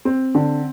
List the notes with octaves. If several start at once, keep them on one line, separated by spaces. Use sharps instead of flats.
C4
D3